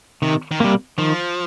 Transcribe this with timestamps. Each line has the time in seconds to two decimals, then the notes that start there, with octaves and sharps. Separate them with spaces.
0.22 C3 D#3
0.51 D#3
0.60 C3 G3 A#3
0.98 D#3 F3